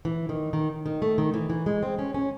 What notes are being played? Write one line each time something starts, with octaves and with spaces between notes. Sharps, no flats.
E3
D#3
D#3
D#3
A3
D#3
E3
E3
G#3
C4
C#4
C#4